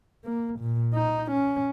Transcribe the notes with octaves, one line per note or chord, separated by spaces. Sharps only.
A#3
A#2
D#4
C#4